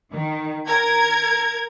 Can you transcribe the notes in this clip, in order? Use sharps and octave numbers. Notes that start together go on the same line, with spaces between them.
D#3
A#4 G#6